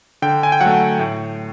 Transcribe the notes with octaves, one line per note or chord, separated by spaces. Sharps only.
D3 G5
G#5
G5
F#3 F#5
A3
A2